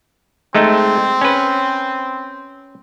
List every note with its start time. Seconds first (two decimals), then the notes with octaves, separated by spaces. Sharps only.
0.55 G#3 A3 C4 D#4
1.21 C#4 B4